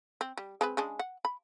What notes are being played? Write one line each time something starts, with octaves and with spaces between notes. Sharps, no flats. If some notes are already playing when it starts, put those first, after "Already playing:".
C4
G3
G#3 C4 B4
C#3 G#3 D4
F#5
B5